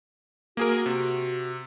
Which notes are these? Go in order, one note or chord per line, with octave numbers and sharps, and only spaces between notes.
A#3 F#4 G#4 A#4
C3